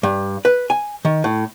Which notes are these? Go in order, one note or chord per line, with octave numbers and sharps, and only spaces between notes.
G2
B4
G#5
D#3
A2